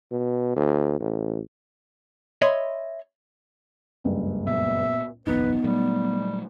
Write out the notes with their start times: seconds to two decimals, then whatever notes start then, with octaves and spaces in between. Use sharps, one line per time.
0.12 B2
0.56 D2
1.00 A1
2.42 C#5 D#5 E5 B5 C6
4.04 F#1 C#2 G2
4.47 A#2 B3 E5
5.27 F#1 B1 E2 B3 D#4 B4
5.64 A#2 F#3 G3 A3